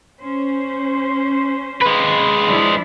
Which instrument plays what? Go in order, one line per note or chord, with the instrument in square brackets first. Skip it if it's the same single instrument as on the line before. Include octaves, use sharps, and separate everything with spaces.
[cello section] C#4 C5
[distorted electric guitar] G#3 B4
[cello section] F3 D4 E4